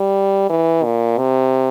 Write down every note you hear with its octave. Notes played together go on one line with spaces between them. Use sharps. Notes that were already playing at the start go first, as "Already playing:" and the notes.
Already playing: G3
E3
A#2
C3